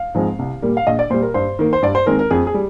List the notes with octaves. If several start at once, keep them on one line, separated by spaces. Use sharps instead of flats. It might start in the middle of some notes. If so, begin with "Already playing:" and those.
Already playing: F5
G#2 F3 G#3 C4
C2
A#2 G3 A#3
F5
A#1 D#5
D5
A#2 G3 C5
A#4
G2 C5
D#3 A#3
C5
G2 D5
C5
D#3 G#3 C4 A#4
A#4
F2 G#4
G#4
G3